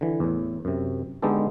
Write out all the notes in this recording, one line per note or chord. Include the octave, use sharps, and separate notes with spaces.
D3 E3
E2 A2
F#2 C3
D3 G#3 B3 D#4 G4 A4